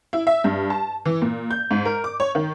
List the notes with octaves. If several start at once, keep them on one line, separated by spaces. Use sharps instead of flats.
E4
E5
G2
A5
E3
A#2
G6
G#2
A#4
D6
C#5
D#3